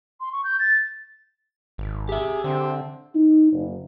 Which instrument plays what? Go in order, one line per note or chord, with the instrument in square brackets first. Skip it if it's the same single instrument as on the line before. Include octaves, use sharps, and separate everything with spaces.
[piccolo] C6
C#6
G6
A6
[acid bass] G#1
[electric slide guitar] G4 E5 [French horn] G#4
[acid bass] D3 [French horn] C4
[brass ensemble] D#4
F#1